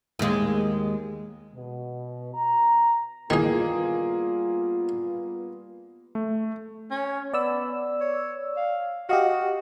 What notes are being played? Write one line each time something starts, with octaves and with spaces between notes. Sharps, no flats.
D#2 G#3
B2
A#5
D#3 E3 G3 A#3 B3 F4 G#4
A3
C#4
B3 D5 E6
C#5
F5
F#4 G4 D#5 F5